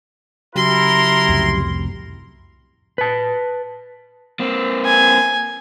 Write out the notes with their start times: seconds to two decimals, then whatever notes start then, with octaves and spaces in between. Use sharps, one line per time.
0.55 C#3 F#3 E4 G4 A#4 C6
1.29 C2 F2 A2
2.98 B4 A5
4.39 A#3 C4
4.85 G#5